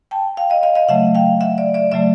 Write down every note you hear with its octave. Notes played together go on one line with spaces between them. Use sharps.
G5 A5
F5 G5
D#5 F5
D#5 F5
D#5 F5
C#3 F#3 A3 E5 F#5
F5 G5
E5 F#5
D5 E5
D5 E5
C#3 F#3 A3 D5 E5